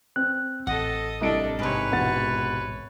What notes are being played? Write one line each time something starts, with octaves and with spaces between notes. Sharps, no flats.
C4 F#6
A1 A4 D#5 F#5
C2 D4 A4 D#5 D7
G#2 C3 B4 C#5
E1 F#5 A6